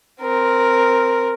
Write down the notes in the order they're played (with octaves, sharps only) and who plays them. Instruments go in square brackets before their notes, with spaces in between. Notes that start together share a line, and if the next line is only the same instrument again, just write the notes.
[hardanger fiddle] C4 A#4